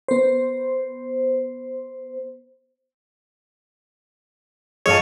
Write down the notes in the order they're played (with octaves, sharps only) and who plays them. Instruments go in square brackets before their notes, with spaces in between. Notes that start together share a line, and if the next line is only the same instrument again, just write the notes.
[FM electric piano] B3 C5
[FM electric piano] G2 F3 G#4 [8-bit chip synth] C#5 [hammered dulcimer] D#5 F5 A5